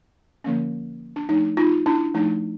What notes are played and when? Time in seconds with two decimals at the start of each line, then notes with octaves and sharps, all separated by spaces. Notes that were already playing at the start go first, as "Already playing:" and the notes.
0.44 D3 F3 A#3 C#4
1.16 D4
1.29 F3 A3 D4 D#4
1.57 D#4 F4
1.86 D4 E4
2.14 F3 A3 D4 D#4